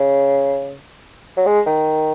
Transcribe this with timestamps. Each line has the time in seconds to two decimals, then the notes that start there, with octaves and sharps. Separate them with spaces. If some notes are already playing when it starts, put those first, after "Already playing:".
Already playing: C#3
1.37 F#3
1.46 G#3
1.67 D#3